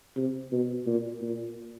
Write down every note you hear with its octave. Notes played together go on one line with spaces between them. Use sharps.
C3
B2
A#2
A#2